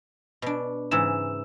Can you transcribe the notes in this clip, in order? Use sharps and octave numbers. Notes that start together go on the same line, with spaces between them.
B2 D4
G#2 C#3 E3 E6 E7